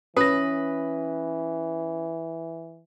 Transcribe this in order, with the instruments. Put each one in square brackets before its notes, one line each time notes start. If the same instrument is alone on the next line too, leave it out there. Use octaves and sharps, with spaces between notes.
[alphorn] E3 [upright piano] C#4 [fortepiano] B4 [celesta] D#6 A#6